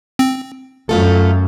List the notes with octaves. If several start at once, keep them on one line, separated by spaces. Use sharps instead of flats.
C4
F#2 A3 F4 A4